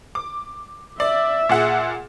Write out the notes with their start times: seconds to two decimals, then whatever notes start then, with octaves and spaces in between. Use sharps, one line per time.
0.15 D6
1.00 D5 E5
1.49 A#2 G#4 F#5